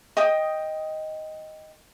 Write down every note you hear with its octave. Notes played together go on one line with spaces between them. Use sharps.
D#5 G5 D#6